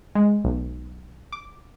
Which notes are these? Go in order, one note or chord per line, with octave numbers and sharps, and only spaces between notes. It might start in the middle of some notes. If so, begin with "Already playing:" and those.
G#3
B1
D6